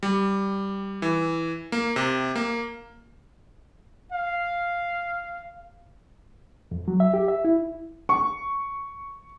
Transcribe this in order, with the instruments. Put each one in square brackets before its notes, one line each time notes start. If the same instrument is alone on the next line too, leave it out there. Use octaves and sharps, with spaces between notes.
[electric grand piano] G3
E3
A#3
C3
A#3
[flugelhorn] F5
[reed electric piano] F2
F#3
E5
G4
E5
E4
[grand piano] C#6